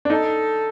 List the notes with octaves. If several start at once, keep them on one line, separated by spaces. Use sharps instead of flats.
D4
D#4 A4